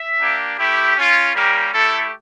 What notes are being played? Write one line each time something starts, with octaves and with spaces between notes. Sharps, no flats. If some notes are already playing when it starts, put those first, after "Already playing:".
Already playing: E5
A#3 D4 G4
A3 E4 G4
C#4 F4
G3 A#3 C#4 G4 A#4
A3 E4 G4 A4